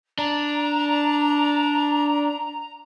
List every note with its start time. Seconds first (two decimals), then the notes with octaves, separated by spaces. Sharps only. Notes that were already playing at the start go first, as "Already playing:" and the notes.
0.19 D4 A#5